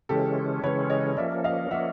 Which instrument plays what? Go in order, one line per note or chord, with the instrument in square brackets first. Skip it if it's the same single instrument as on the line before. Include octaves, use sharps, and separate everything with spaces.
[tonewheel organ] C#3 E3 G#3 C#4 [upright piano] G4 A4
[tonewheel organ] C#3 E3 G#3 C#4 [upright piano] B4 C#5
[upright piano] C#5 D#5
[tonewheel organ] F3 A#3 C#4 [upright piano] D5 E5
[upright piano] D#5 F5
[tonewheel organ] F3 A#3 C#4 [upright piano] E5 F#5